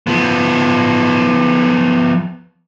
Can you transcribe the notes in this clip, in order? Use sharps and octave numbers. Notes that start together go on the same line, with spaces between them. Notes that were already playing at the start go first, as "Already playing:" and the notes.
F3 B3